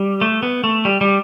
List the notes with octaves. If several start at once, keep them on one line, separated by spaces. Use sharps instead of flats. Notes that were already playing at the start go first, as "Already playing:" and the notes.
Already playing: G3
A3
B3
A3
G3
G3